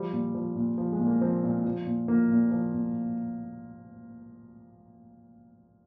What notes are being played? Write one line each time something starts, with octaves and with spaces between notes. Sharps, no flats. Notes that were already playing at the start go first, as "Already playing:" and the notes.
Already playing: F3 G3
A#2
F3
A#2
F3
G#3
A#2
A#3
F3 C4
A#2
F3
A#2
F3 A#3
A#2
F3
A#2